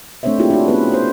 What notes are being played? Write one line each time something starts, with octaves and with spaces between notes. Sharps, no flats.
A3 C4 D4 C5 C#5 E5
A#3 D4 E4 F4 G4 G#4
D4 F#4
B3 C#4 G#4 B4
F#4 C5